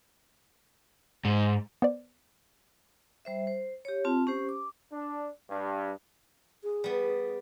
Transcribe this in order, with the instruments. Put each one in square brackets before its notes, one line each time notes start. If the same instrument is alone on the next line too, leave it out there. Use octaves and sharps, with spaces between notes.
[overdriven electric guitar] G#2
[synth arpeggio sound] B3 C5 D5
[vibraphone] G3 C5 E5
C5
G4 C#5
C4 F4 A5
C#4 G4 C5
D6
[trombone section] D4
G2
[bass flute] G#4
[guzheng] G3 B3